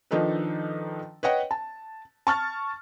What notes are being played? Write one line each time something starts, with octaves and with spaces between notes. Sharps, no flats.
D#3 F3 D4 D#4 A4 B4
B4 C#5 D#5 F#5 G5
A5
A5 C#6 F6 A6